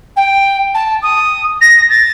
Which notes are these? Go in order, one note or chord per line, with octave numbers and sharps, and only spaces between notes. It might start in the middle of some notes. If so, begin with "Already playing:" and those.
G5
A5
D#6
A#6
A6